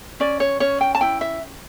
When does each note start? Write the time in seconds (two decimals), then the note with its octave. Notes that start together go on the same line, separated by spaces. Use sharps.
0.20 C#4 D5
0.40 C#5
0.60 C#4 C#5
0.81 G5
0.95 A5
1.01 E4 G5
1.21 E5